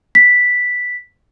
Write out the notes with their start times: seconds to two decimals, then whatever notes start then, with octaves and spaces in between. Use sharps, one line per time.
0.15 B6